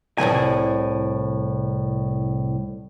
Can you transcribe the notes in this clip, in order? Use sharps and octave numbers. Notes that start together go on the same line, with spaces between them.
C2 A2 D#3 G#5